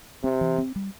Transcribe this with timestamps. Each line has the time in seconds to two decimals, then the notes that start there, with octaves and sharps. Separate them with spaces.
0.23 C3 C4
0.41 E3
0.58 C4
0.76 G3